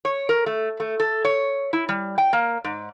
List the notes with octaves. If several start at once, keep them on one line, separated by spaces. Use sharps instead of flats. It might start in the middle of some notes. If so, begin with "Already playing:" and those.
C#5
A#4
A3
A3
A4
C#5
E4
G3
G5
A#3
G#2